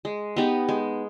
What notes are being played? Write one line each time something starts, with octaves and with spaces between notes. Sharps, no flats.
G#3
B3 D#4 G4
G#3